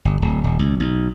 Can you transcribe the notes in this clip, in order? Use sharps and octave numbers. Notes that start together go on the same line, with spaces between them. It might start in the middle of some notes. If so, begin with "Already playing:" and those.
G1
D1
D#1
C#2
B1